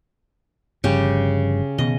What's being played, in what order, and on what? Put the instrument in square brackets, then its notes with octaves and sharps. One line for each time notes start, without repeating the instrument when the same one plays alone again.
[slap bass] G1 G2 F3 [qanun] C#3 G4
[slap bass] B2 D#3 B3 [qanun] D#5